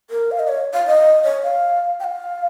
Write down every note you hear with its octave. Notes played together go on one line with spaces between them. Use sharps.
A#4
F5
D#5
C#5
F5
D#5
C#5
F5
G5
F5